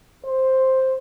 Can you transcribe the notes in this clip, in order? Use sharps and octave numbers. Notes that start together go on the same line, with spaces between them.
C5